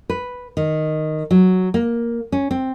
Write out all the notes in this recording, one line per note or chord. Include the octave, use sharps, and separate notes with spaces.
B4
D#3
F#3
A#3
C#4
C4